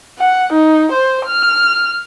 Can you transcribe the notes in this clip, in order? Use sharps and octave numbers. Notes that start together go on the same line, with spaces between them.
F#5
D#4
C5
F6